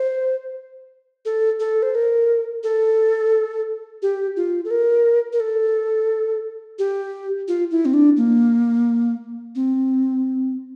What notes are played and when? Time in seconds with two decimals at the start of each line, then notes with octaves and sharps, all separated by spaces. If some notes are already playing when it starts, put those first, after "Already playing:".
Already playing: C5
1.25 A4
1.60 A4
1.83 C5
1.95 A#4
2.64 A4
4.02 G4
4.37 F4
4.65 A4
4.71 A#4
5.33 A#4
5.40 A4
6.79 G4
7.48 F4
7.71 E4
7.85 C4
7.94 D4
8.17 A#3
9.55 C4